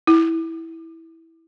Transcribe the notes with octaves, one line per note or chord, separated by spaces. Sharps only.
E4